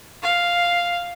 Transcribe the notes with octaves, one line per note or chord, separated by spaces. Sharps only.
F5